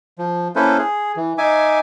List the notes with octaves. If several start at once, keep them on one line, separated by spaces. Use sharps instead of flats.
F3
A#3 C#4 E4 A4 B4 C5
G#4
E3
D#4 E5 G#5 D6